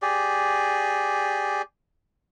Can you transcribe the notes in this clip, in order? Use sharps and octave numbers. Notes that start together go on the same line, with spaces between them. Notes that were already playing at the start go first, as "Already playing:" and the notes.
G4 G#4 D5